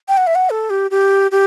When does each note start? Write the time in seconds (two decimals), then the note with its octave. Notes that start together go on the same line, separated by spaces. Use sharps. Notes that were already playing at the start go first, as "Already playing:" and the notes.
0.08 G5
0.17 F#5
0.27 E5
0.35 F#5
0.50 A4
0.70 G4
0.91 G4
1.31 G4